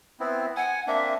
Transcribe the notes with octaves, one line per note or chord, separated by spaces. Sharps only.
B3 C4 E4
F#5 G#5
A#3 C4 D4 E5